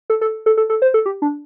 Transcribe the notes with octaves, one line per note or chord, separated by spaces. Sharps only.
A4
A4
A4
A4
A4
C5
A4
G4
D4